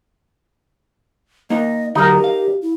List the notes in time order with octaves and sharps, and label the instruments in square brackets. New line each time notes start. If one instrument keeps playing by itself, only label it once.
[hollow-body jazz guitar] A#3 D#4 [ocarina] D#5
[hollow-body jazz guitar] D3 F#3 [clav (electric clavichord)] D#4 A#4 [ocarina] G4
[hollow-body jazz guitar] F5
[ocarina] E4